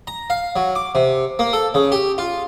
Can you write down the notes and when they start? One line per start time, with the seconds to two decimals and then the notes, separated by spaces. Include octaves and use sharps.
0.07 A#5
0.30 F5
0.56 F#3
0.75 D6
0.95 C3
1.39 A#3
1.53 A4
1.74 C#3
1.92 G4
2.18 F4